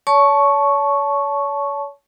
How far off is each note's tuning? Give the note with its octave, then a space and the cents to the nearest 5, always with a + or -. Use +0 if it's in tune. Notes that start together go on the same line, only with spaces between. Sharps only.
C#5 +35 A5 -15 C#6 +0